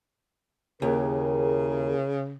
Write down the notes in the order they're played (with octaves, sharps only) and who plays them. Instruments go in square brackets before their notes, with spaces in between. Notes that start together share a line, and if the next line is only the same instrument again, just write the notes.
[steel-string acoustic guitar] D#2 [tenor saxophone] C#3 [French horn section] E4 G#4 A#4